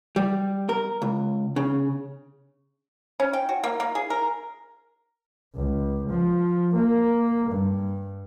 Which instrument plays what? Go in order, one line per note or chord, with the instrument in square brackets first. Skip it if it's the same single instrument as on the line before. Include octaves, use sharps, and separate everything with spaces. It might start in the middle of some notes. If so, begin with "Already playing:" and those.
[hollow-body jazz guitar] G3
A#4
C#2
C#3
[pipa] C#4
G5
F#4
A#3
A#3
G#4
A#4
[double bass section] C#2
F3
A#3
G2